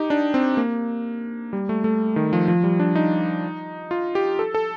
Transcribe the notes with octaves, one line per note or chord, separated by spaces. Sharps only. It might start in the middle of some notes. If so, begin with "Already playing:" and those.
Already playing: D#4 G4
D4
C4
A#3
G3
A3
A3
D#3
F3
F3
G3
D4
D#4
F4
G4
A4
A4